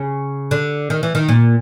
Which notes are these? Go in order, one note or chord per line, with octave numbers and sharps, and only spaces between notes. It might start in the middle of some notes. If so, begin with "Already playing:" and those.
Already playing: C#3
D3
D#3
E3
D#3
A#2